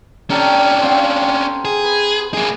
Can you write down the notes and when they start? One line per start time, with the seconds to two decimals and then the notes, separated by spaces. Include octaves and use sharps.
0.30 C#4 D4 G4 A4 A#5
0.81 C4 F5 F#5
1.65 G#4
1.84 B4
2.34 A#3 G#4